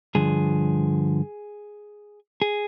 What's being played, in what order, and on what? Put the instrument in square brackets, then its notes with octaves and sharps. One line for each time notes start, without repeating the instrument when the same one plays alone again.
[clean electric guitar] G2 D3 F3 G#4
G#4